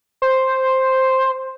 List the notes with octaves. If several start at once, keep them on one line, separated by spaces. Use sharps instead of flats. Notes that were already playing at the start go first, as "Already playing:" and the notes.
C5